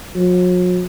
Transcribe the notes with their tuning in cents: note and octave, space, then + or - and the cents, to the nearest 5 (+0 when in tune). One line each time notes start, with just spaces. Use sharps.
F#3 -45